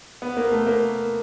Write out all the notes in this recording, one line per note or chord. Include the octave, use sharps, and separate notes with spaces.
B3
A#3
A3
A#3